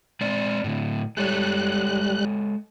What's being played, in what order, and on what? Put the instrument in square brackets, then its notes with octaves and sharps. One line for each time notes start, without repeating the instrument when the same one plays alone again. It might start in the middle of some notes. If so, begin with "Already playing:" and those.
[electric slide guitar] G#3 C4 D5
A2 D3
[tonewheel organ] G3 F#6 [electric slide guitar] G#3 A4 C#5